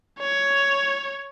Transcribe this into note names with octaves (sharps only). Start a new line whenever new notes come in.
C#5